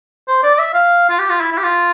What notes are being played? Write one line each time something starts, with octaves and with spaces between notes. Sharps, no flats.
C5
D5
D5
E5
F5
F4
G4
F4
E4
E4
G4
F4